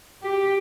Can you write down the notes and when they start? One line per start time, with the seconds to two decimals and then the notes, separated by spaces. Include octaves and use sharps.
0.23 G4